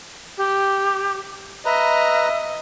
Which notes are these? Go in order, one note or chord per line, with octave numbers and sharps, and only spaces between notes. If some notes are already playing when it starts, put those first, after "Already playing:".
G4
B4 D#5 E5 A#5